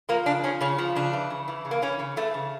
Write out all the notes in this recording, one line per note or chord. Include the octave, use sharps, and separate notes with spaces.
F3 A#3
C#3 D4
F3 C#4
C#3 C#4
F3
C#3 D4
E3
C#3
E3
C#3
A#3
E3 C#4
C#3
E3 A3
C#3